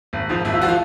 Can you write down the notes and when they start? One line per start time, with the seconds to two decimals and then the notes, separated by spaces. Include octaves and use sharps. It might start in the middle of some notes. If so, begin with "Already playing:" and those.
0.13 G#1
0.29 G#2 F3
0.45 G#1 E4
0.54 F4
0.61 F3 F#4
0.68 F4